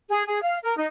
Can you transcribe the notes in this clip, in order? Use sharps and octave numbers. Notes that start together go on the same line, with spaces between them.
G#4
G#4
F5
A#4
D#4